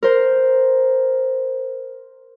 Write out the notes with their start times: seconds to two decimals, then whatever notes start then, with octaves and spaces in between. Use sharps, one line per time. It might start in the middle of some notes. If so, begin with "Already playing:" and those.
0.03 A#4 C5